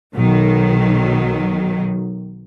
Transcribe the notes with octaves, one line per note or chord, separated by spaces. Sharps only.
B1 D#3 F#3